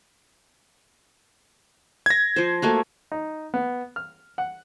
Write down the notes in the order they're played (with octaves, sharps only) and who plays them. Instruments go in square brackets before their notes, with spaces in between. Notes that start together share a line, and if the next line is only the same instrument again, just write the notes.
[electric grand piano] G#6 A#6
[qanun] F3 C5
A3 A#3 F#4
[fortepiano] D#4
B3
F6
F#5